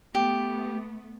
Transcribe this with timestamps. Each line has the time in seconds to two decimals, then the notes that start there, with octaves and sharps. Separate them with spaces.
0.15 A3 B3 G4